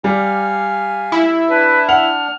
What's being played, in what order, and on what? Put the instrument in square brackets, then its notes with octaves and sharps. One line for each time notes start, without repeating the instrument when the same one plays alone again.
[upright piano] G3 [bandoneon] F5 G#5
[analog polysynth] E4
[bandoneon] D4 [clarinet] B4
[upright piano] F#5 [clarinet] F6